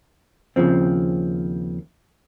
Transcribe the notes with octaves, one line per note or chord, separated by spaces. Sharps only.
D#2 G#2 C#3 F3 C4